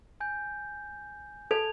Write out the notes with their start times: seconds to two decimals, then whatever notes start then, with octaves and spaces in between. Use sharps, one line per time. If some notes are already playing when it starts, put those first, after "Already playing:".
0.20 G#5 G6
1.51 A4 A5 G#6 F7